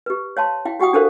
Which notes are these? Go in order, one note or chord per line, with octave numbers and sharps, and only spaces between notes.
G4 B4
C#5 F5 A5 C6
E4 F5 G5
F#4 G4 F#5 G5 D#6
D4 G4 A4 A#4 C5 F5